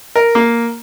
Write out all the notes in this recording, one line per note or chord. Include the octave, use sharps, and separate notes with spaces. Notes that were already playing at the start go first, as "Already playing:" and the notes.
A#4
A#3